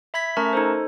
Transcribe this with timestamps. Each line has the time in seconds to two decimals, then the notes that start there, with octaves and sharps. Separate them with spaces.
0.14 E5 B5 G#6 B6
0.37 A3 C#4 A#4 A5 A#5 C#6
0.53 D#4 A4 C5